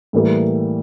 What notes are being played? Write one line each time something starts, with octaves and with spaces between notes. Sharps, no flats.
A2 E3 G3 A#3